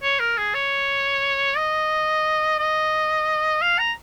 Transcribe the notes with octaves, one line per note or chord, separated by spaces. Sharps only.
C#5
A#4
G#4
C#5
D#5
D#5
F5
A#5